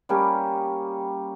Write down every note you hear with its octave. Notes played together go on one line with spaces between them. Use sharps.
G3 A#3 C#4 G4